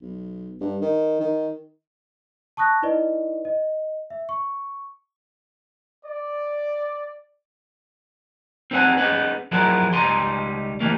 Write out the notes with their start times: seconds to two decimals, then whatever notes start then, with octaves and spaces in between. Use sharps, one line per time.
0.01 B1
0.60 G2
0.81 D#3
1.20 D#3
2.57 A5 C#6 D#6 F#6 A#6
2.82 D#4 E4 B4 D5 D#5
3.45 D#5
4.10 E5
4.29 C#6
6.06 D5
8.71 C4 D#4 B4 D5 F#5 G#5
8.98 B3 C#4 D#4 G#4 B4
9.52 F3 F#3 B3 E4 G#4 A#4
9.93 C#2 G3 D#4 G#5 A#5 C6
10.80 C#3 E3 G3 A3 A#3